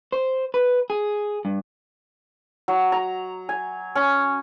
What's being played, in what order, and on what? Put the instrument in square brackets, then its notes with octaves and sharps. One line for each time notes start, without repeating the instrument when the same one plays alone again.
[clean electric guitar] C5
B4
G#4
G2
[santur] F#3
A#5
G#5
C#4